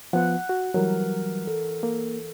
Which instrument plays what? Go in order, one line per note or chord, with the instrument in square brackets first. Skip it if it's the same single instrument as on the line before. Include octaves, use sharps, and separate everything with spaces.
[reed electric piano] F3 B3 F4 [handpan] F#5
[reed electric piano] F#4
[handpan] E3 A#4 [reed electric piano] F#3 G3
[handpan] A4
[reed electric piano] A#3